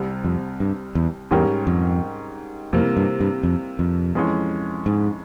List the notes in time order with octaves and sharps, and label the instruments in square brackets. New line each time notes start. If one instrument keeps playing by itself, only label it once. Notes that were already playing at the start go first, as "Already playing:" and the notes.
Already playing: [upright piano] C2 C3 G3
[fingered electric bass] F2
G2
E2
[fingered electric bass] E2 [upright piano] G#2 G3 C#4 G4 A#4
[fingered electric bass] F2
[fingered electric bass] F2 [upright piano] C3 E3 G3 A#3
[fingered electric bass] G2
G2
F2
F2
[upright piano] F2 E3 G#3 C#4
[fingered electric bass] G#2